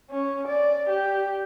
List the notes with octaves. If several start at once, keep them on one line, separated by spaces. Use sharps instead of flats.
C#4
D5
G4